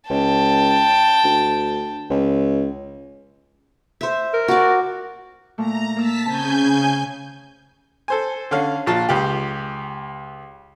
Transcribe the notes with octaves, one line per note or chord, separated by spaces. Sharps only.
C#2 G5 A5
D2
C#2
C5 E5
A#4
F#4 D5
A#2 A3 A#5
A#3 A5 E6 B6
C#3 C4 G#5 A5 G6
A4 C5 G#5
D3 C#4 F5
A#1 F4 A5
C#2 G4